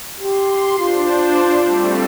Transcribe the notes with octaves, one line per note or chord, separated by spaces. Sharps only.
G4 C6
D4 F4 C5
G3 A3 C4